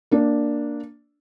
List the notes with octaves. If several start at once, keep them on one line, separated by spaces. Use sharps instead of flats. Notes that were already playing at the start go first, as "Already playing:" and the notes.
A#3 D4